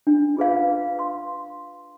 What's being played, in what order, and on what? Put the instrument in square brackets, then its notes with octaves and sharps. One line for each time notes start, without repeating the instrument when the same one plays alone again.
[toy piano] D4
F4 G#4 B4 F5
B4
F5 C6